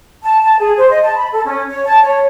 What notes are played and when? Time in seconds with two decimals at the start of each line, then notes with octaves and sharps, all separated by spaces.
0.23 A5
0.42 A5
0.59 G#4
0.77 C5
0.90 D#5
1.03 A5
1.15 B5
1.31 A4
1.45 C#4
1.69 C#5
1.85 A5
2.01 C#5